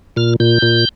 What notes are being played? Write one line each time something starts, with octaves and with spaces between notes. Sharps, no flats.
A#2 F6
A#2 G6
A#2